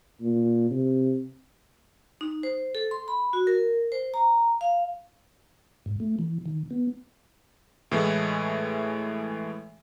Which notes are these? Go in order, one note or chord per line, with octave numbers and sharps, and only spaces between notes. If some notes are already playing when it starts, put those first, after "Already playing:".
A#2
C3
D#4
C5
A4
C6
B5
F#4
A#4
C5
A#5
F5
G#2
A3
E3
D#3
B3
A2 E3 G#3 A3